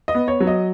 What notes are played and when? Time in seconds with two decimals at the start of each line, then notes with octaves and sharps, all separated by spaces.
0.08 D#5
0.14 B3
0.28 C#5
0.40 F#3
0.47 D#5